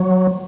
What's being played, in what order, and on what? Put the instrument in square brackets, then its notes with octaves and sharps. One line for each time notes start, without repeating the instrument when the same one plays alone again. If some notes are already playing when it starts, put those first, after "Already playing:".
Already playing: [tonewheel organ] F#3